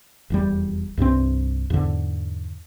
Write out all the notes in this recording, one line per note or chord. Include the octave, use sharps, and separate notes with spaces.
F1 E2 G3
C2 G2 C3 C4
E2 G#2 D3